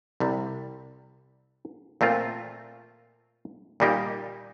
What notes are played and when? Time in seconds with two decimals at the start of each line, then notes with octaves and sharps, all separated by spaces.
0.20 C2 C3 G3
2.01 A#2 A3 C4 F4
3.80 A#2 G3 A#3 D#4 G4